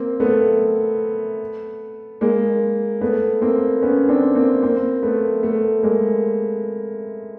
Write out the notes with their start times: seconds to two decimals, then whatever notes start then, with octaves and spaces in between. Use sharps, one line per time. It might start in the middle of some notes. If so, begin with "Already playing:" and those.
Already playing: A#3 C4
0.20 A3 B3
2.21 G#3 A#3
3.01 A3 B3
3.42 A#3 C4
3.82 B3 C#4
4.09 C4 D4
4.35 A#3 C4
4.62 A#3 C4
5.03 A3 B3
5.43 A3 B3
5.83 G#3 A#3